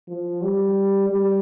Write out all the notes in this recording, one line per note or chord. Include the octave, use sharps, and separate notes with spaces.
F3
G3
G3